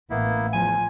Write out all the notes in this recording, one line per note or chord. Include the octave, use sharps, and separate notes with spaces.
A1 A#3 B3 E4
E2 F3 G#5